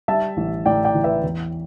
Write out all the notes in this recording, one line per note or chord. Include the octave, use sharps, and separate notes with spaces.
G3 E5 A5
A1
A2 D5 G5
D5 G5
E3
B4 E5
E2